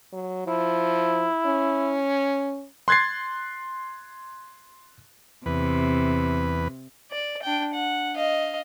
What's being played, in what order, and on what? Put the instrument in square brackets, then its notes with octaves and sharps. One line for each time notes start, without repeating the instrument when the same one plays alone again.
[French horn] F#3
[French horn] F3 [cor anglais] E4
[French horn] C#4
[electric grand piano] C6 F#6 G#6 A6 C7
[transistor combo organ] E2 B4 [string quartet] C3
[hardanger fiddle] D5
D4 G5
F#5
D#5 F5